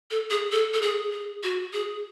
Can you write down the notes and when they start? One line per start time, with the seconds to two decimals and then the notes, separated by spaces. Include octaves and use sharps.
0.11 A4
0.31 G#4
0.52 A4
0.74 A4
0.82 G#4
1.12 G#4
1.43 F#4
1.73 G#4